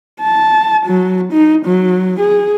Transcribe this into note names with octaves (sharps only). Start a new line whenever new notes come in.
A5
F#3
D#4
F#3
G#4